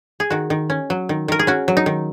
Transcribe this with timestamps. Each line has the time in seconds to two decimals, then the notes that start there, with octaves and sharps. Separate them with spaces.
0.20 G#4
0.30 D#3 F#4
0.50 D#3
0.70 C#4
0.90 F#3
1.09 D#3
1.28 D#3 A#4
1.39 G#4
1.47 C#4 F#4
1.68 F#3
1.77 D#4
1.86 D#3